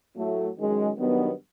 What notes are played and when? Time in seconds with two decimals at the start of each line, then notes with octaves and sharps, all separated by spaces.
0.16 A2 F#3 A3
0.57 F#2 D#3 G#3
0.98 G2 D#3 F#3 B3